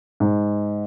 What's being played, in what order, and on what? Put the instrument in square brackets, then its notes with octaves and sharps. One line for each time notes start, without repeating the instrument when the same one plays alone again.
[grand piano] G#2